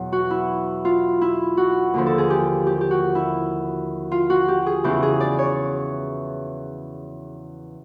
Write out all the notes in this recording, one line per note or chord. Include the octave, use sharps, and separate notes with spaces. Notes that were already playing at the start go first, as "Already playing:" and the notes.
Already playing: E2 B2 F#3
F#4
E4
F4
E4
F#4
D#2 D3 F3
A4
G#4
G4
G4
G4
F#4
E4
F4
F#4
G4
G#4
E2 C#3 E3 G4
G#4
D5
C#5